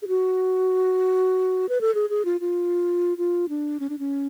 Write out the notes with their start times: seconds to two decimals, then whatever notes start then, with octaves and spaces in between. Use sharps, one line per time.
0.02 G#4
0.08 F#4
1.69 B4
1.81 A4
1.95 G#4
2.10 G#4
2.25 F4
2.41 F4
3.18 F4
3.49 D4
3.80 C#4
3.90 D4
3.99 C#4